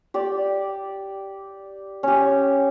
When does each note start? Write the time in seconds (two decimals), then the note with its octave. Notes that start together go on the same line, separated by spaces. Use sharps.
0.14 G4 D5
2.03 C#4 G4